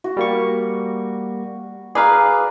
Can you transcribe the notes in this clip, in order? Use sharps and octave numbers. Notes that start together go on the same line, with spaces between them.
F#4
G3 A#3 C#6
G#4 B4 D5 F5 A#5